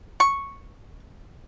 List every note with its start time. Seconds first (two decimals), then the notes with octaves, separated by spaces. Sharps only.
0.20 C#6